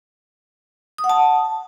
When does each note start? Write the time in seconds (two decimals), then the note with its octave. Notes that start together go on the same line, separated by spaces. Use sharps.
0.98 D#6
1.04 F#5
1.09 A5